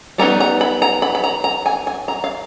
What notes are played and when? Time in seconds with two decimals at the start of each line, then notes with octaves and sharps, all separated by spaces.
0.18 G3 B3 D#4 A#5
0.40 A#5
0.61 B5
0.82 A#5
1.02 B5
1.15 B5
1.24 A#5
1.44 A#5
1.66 G#5
1.87 G#5
2.08 A#5
2.24 F5